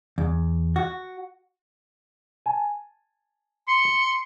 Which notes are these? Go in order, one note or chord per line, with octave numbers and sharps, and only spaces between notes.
E2
F#4
G#5 A5
C6 C#7